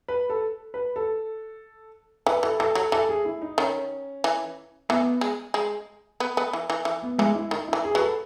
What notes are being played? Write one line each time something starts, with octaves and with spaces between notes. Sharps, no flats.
B4
A4
B4
A4
E3 B4
E3 A4
E3 A4
F#3 A4
E3 A4
G#4
E4
D#4
D#3 C#4
E3
E3 B3
G#3
G#3
B3
B3
E3
E3
E3
B3
E3 G#3
E4
D#3 D#4
E4
E3
G#4
F#3 B4
A4